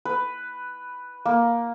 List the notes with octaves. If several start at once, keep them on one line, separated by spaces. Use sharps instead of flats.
B4
A#3